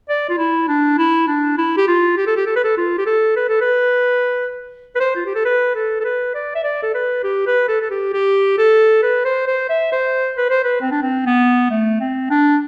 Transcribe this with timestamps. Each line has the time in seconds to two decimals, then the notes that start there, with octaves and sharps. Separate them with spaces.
0.09 D5
0.29 F4
0.38 E4
0.68 D4
0.98 E4
1.27 D4
1.58 E4
1.77 G4
1.88 F4
2.17 G4
2.27 A4
2.36 G4
2.46 A4
2.56 B4
2.64 A4
2.77 F4
2.98 G4
3.06 A4
3.36 B4
3.49 A4
3.61 B4
4.95 B4
5.00 C5
5.16 F4
5.26 G4
5.35 A4
5.45 B4
5.75 A4
6.00 A4
6.04 B4
6.34 D5
6.55 E5
6.64 D5
6.83 A4
6.94 B4
7.23 G4
7.47 B4
7.68 A4
7.80 A4
7.91 G4
8.13 G4
8.58 A4
9.02 B4
9.25 C5
9.47 C5
9.69 E5
9.92 C5
10.37 B4
10.50 C5
10.64 B4
10.81 C4
10.91 D4
11.02 C4
11.26 B3
11.71 A3
12.00 C4
12.30 D4